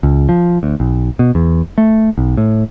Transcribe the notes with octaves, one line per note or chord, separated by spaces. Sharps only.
C#2
F3
D2
B1
B2
E2
A3
B1
A2